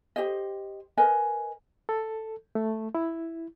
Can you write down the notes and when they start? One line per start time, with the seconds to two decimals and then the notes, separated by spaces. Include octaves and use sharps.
0.16 G4 C5 D#5
0.97 A#4 B4 D#5 G#5
1.89 A4
2.55 A3
2.95 E4